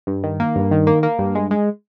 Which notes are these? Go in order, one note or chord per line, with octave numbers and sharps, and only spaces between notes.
G2
D#3
A#3
G2
D#3
A#3
A#3
G2
G#3
G#3